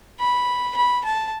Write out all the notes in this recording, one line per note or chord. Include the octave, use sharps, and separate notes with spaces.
B5
B5
A5